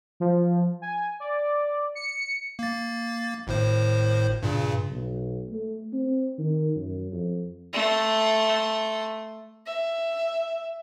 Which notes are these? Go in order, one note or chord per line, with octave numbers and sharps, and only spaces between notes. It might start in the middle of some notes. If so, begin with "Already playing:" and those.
F3
G#5
D5
C#7
A#3 A6
G#1 A2 C5
G2 A#2 C#3
B1
A3
C4
D#3
F#2
F2
A3 C6
E5